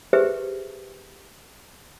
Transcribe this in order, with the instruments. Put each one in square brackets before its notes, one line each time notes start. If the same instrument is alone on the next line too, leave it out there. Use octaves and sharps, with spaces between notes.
[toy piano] G4 G#4 B4 C5 E5